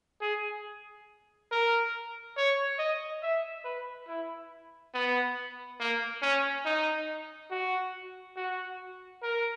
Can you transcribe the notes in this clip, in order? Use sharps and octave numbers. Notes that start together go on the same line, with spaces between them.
G#4
A#4
C#5
D#5
E5
B4
E4
B3
A#3
C#4
D#4
F#4
F#4
A#4